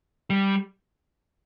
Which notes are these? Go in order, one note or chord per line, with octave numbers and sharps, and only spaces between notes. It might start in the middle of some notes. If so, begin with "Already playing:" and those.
G3